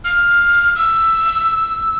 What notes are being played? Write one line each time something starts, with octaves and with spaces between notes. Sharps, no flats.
F6
E6